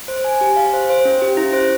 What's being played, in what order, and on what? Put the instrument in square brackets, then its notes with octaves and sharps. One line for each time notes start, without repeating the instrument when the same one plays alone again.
[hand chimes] C5
G#5
G4
F5
C5
C5
C#4
G4
E4
C5